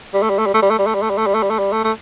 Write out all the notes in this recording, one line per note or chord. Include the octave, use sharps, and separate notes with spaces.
G3
A3
G3
A3
G3
A3
G3
A3
G3
A3
G3
A3
G3
A3
G3
A3
G3
A3
G3
A3
A3